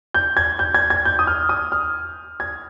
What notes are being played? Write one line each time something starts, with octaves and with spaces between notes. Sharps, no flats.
G6
G#6
G6
G#6
G#6
G6
D#6
F6
D#6
F6
G#6